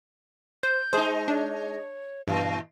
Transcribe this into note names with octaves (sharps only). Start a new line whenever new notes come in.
C5 G6
G#3 D#4 G#4 C5
D4 C#5
G2 A#2 E3 F5